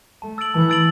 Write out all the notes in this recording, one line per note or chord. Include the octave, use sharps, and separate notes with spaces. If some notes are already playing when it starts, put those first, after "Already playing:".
A3 A5
E6 A6 D7 F#7
E3 A5
E6 A6 D7 F#7